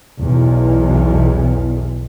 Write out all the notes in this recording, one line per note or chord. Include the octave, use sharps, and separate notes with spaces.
B1 E2